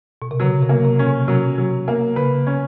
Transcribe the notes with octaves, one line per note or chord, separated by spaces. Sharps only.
B2
C3
C#3 F#3
C3
A#3
C3
C#4
B2
C3 F#3
F#3
A#3
C#3 B4
C#4